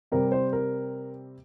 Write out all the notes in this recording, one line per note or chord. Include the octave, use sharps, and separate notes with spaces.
C3 G3 C4 A#4
C5
A#4